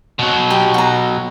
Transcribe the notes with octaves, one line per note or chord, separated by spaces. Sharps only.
B2 F#3
G4 A#5
F#4 A#5